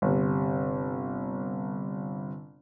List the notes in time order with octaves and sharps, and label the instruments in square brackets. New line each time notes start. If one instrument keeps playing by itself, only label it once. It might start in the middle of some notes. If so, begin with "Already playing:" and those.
[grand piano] G1 C3